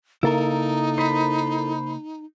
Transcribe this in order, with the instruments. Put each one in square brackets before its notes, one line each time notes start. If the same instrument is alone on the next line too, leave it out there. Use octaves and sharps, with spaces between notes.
[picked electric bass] C#3 A#3 [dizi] D#4 [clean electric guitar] E4 A4 A#4
[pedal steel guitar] C5 B5